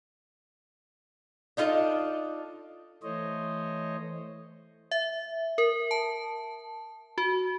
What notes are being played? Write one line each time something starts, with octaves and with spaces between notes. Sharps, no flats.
D4 D#4 F4 A4 D#5
E3 A3 C5 C#5 D#5
E5
A#4
A5
F#4